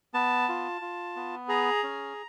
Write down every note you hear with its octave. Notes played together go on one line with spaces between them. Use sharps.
B3 A5
F4
F4
B3
G#4 A#5
C#4